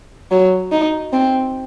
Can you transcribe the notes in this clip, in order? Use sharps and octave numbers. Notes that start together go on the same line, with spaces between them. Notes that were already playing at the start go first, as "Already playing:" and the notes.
F#3
D#4
C4